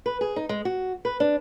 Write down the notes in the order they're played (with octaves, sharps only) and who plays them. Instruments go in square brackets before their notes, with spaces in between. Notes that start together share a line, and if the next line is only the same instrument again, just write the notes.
[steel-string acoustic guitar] B4
G#4
D#4
G#3
F#4
B4
D4